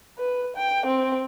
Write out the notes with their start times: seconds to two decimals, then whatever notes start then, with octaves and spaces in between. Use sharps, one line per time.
0.18 B4
0.57 G5
0.86 C4